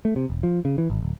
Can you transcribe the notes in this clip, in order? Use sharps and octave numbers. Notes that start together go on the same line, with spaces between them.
A3
C3
E1
F3
C#3
E3
G#1
D1